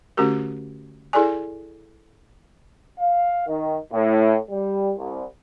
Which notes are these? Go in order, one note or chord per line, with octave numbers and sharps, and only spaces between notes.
D3 A3 C#4 F#4 G4 A#4
E4 G#4 A4 D5 G#5
F5
D#3
A2
G3
C2